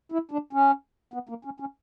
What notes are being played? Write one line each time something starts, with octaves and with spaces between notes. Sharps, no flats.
E4
D4
C#4
B3
A#3
C#4
C#4